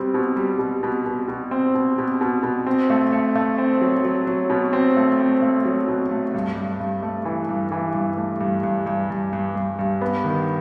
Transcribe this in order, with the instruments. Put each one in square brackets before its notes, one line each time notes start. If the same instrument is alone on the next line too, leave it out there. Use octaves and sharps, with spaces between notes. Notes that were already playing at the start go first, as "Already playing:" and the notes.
Already playing: [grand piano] B2 G3 C4
B2
G3
B2
B2
B2
B2
C4
B2
B2
B2
B2
C4
A3
A3
A3
C4
F#3
F#3
F#3
B2
C4
A3
C4
A3
F#3
B2
A3
G2
G2
G2
A3
E3
G2
E3
G2
A3
G2
G2
G2
G2
G2
G2
G2
B3
D#3